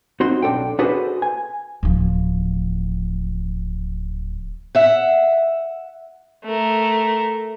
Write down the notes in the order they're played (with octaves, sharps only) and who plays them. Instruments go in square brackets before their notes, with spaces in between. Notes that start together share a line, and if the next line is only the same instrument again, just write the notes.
[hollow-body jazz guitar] C4 D#4 F#4 C6
B1 D4 A4 G5
D4 F#4 G#4 A4 B4 C5
G#5
[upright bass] D1 F3
[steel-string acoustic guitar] E5 F#5
[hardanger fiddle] A3 A#4